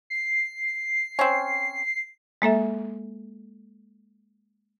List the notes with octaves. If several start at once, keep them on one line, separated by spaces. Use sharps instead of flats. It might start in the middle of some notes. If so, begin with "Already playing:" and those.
C7
C4 C#4
G#3 A#3 A4 E5